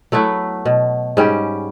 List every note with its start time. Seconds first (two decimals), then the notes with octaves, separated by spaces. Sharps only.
0.12 F#3 A3 B3 E4
0.65 B2
1.17 G#2 G3 C#4 G4